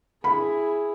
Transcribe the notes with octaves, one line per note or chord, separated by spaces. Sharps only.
E4 G#4 B5